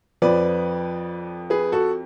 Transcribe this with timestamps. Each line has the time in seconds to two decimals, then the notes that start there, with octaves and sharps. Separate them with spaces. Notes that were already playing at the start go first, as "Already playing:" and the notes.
0.22 F2 F3 B4 D5
1.50 G#4 B4
1.72 F#4 A4